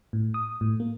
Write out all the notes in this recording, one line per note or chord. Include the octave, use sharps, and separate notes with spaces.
A2
D#6
A2
A#3